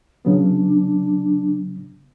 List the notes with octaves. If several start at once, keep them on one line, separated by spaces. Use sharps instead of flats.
C#3 F#3 B3 D4